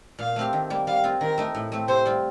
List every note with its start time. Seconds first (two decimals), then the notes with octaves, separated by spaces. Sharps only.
0.19 A#2 F5
0.36 A3 C4 G4
0.53 D#3
0.70 G3 A#3
0.87 G3 F5
1.04 C4 F4
1.21 D#3 A#4
1.38 A3 D#4
1.55 A2
1.72 A3 C4
1.88 C3 C5
2.05 G3 C4 F4